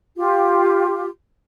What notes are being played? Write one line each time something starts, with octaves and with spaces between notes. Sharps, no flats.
F4 G4